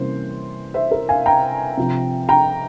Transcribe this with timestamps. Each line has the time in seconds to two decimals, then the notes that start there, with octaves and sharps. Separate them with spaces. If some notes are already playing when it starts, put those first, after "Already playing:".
Already playing: C3 E3 G3 A#3 C#4 C5
0.74 C5 E5
0.91 A#4
1.09 F5 G#5
1.26 G5 A#5
1.77 C3 F3 C4
2.29 G5 A#5